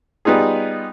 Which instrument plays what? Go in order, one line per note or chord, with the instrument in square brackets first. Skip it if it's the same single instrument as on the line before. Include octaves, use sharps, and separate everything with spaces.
[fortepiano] G3 B3 D#4 F4 G#4